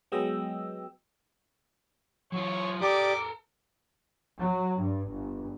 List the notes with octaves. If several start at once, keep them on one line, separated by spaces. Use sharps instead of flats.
F#3 G#3 B3 D#5 G5 E6
F#3 F4 C#5
G4 A4 A#4 D5 D6 D#6
F#3
G2
G1